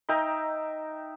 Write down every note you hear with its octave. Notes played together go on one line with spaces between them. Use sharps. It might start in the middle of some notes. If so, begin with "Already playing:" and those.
D#4 E5 G5 A#5